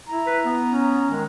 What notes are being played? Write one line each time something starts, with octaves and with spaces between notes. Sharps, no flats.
E4 A#5
B4
B3
C#4
D#3 G#3